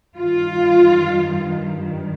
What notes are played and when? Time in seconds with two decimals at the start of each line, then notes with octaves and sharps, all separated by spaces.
0.16 G2 D#3 F4